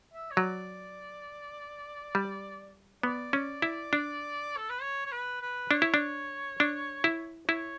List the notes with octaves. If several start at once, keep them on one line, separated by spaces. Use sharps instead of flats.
E5
C#5
F#3 D5
G3
B3 D5
C#4
E4
D4
A4
B4
C#5
C#5
B4
B4
D4 C#5
E4
D4
D4
E4
E4 C#5